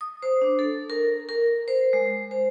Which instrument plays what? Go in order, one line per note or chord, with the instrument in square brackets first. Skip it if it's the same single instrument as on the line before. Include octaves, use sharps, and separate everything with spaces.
[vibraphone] D#6
C5
D4
A4
A#4
A#4
C5
G#3
C5